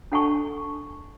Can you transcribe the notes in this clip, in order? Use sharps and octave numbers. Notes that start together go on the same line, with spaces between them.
D4 A4 F#5 G#5 A5 C#6